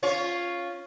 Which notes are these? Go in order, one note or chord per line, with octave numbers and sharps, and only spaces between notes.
C#4 F4 C#5